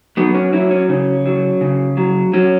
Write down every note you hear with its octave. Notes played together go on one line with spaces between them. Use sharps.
F#3 B3
C#4
F#3 E4
C#4
C#3 C#4
F#3
C#3
F#3
F#3 C#4